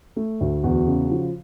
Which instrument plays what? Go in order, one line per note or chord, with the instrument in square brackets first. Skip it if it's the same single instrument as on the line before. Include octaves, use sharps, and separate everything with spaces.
[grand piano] A3
D2
E2 F#4
C#3
F3